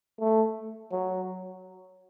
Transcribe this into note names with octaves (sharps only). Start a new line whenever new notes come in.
A3
F#3